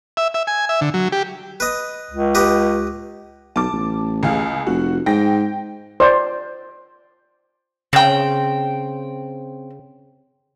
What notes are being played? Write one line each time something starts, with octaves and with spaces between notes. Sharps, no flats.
E5
E5
G#5
E5
D3
F#3
G4
B4 D#5
C#2
G4 B4 D#5
B1 A5 D6
A1
C#2 G#4 F5
F1 F#4
G#2 G5 A#6
C5 D5
C#3 C4 G5